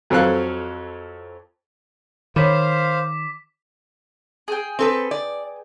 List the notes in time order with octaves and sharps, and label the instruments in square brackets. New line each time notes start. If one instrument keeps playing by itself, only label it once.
[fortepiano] F2 F#3 C4 A4 F5 F#6
[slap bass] D#3 [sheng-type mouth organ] C5 F5 [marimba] C#5 B5 [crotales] D6 B6
[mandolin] G#4 G5
[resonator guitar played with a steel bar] C4 A4 B4
D5